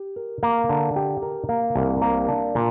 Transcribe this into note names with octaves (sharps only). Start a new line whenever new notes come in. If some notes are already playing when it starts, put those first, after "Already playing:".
Already playing: G4
A#4
A#3
D3
G4
A#4
A#3
C2
A#3
D4
A#2